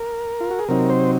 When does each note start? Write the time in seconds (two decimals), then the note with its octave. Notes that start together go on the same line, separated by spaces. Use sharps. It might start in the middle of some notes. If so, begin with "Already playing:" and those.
Already playing: A#4
0.40 F4
0.51 F#4
0.59 G#4
0.69 C3 F#3 C4 D#4 A#4
0.90 C5